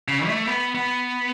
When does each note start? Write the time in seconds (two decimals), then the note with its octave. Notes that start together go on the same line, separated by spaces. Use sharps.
0.08 C#3
0.27 A3
0.46 B3
0.75 B3